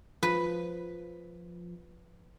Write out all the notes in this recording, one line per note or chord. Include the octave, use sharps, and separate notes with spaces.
F3 B4